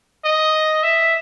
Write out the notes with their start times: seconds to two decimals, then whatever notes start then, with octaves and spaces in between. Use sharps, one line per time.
0.25 D#5
0.83 E5